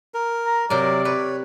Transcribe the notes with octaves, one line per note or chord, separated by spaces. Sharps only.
A#4
A#5
C3 F#3 A#4 D5
B4 C#5